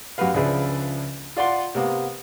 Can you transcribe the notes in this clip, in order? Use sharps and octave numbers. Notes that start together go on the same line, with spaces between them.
F#2 F#4 G4 B4 F5
C#2 F3 D4 G#4 B4 E5
F4 D5 F#5 C6
C3 A#3 B3